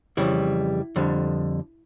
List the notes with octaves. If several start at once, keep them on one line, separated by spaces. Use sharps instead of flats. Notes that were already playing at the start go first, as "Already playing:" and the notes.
F2 C#3 E3 G3 E4
F2 D3 G3